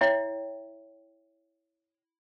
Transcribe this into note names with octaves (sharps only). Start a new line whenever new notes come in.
E4 C#5 E5 G5